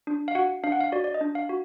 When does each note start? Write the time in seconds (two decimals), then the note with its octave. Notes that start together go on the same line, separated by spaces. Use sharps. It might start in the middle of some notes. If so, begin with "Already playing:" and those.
0.07 D4
0.28 F5
0.35 F#4 F#5
0.64 D4 F5
0.72 F#5
0.81 F5
0.92 F#4 D5
1.04 D5
1.14 D#5
1.21 D4
1.35 F5
1.49 F#4